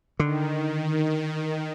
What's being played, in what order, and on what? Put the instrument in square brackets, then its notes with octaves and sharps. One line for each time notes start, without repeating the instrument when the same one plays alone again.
[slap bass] D3 [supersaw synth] D#3